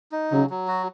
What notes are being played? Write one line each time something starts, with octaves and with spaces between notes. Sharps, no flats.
D#4
C#3 F#3
F#3
F#4